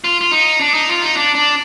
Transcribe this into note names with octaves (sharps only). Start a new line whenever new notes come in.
F4
F4
D#4
D4
D#4
F4
D#4
D4
D4